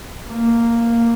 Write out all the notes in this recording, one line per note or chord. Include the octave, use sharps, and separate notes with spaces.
A#3